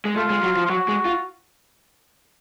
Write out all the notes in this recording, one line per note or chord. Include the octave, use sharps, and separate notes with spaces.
G#3
A3 F4
G#3
F#3
F3
F4
F#3 F#4
G#3
F4